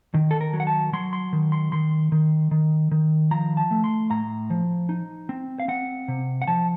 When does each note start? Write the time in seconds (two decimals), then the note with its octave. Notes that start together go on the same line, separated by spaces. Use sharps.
0.14 D#3
0.31 A4
0.41 A#4
0.53 F#3
0.60 F#5
0.67 A5
0.93 F#3 C6
1.13 C6
1.33 D#3
1.52 C6
1.72 D#3 C6
2.12 D#3
2.51 D#3
2.91 D#3
3.31 F3 A#5
3.57 A5
3.71 A3
3.84 C6
4.11 A2 A#5
4.50 F3
4.89 D#4
5.29 C4
5.60 F5
5.68 C4 F#5
6.08 C3
6.42 F#5
6.48 F3 A5